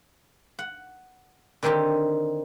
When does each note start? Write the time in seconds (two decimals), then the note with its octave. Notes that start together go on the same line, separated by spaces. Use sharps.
0.59 F#5
1.63 D3 D#3 C4 D#4 G4